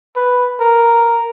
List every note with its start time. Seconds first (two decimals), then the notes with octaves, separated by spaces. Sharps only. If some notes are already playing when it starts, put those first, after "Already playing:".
0.16 B4
0.60 A#4